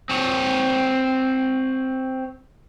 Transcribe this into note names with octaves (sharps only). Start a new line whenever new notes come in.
C4 C#5